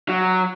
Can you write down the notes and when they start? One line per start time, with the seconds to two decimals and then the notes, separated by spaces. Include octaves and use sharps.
0.09 F#3